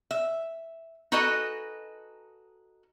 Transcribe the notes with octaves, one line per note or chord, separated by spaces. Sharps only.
E5
D#4 F#4 A4 B4 D#5 G#5